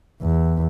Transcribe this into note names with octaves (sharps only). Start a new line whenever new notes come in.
E2